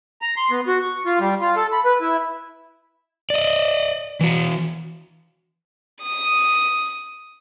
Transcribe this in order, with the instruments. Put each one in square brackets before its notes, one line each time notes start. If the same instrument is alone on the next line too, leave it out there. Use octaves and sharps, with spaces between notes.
[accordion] A#5
C6
B3
F#4
C#6
F4
G3
F4
A4
B5
B4
E4
[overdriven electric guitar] D5 D#5
E3 F#4
[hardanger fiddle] D#6